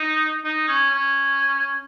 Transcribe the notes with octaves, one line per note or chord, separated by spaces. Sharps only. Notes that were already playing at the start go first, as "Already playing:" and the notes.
Already playing: D#4
D#4
C#4
C#4